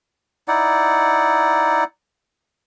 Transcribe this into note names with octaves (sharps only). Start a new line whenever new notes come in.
D#4 E4 D5 F#5